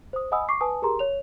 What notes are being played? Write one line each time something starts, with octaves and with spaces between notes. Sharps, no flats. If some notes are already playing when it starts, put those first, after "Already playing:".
C5 D#6
D#5 F#5 G#5 B5 D#6 E6
C#6 D6 C7
B4 G#5 A5 D#6
G4 G#4 A#4 A#5 C6
C#5 F7